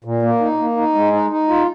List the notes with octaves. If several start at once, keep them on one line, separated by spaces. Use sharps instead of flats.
A#2
A#3
D#4
A#3
D#4
G#3
D#4
D#4
F4